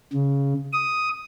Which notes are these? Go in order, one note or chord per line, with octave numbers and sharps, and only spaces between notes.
C#3
D#6